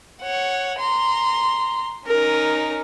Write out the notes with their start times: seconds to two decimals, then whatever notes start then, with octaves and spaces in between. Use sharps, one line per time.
0.22 C#5 F#5
0.79 A#5 C6
2.07 C#4 D#4 A#4